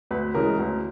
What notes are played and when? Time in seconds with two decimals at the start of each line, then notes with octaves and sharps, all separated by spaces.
0.11 D2 B4
0.34 C#3 E3 G#3 A#4
0.59 D2